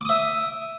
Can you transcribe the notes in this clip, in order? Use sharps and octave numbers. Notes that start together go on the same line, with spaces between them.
E5 D6 D#6